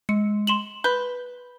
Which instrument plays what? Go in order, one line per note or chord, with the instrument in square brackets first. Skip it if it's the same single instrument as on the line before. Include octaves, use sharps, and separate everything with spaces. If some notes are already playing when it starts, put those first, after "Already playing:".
[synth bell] G#3 [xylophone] C#7
[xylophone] C6 E7 F#7
[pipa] B4 [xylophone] G6 [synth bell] G7